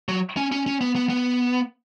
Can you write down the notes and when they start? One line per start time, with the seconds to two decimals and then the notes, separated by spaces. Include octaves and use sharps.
0.09 F#3
0.37 C#4
0.52 C#4
0.67 C#4
0.81 B3
0.95 B3
1.10 B3